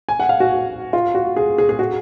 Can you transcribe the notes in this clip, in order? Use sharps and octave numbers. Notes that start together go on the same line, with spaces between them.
G#5
F#5
F5
F#4
F4
F#4
G#4
G#4
G#4
F#4